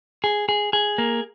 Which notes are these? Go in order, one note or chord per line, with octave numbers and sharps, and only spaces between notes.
G#4
G#4
G#4
A#3